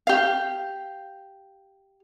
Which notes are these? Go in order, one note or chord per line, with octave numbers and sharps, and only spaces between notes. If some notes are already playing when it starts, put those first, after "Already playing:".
G4 F5